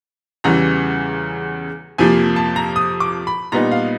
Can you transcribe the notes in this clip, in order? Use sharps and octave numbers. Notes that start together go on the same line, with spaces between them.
E2 C#3 E3 G3 A#5
F2 C3 F3 A#3 G#5
A5
A#5
D#6
D6
B5
A#2 G3 B3 D#4 A#5
F5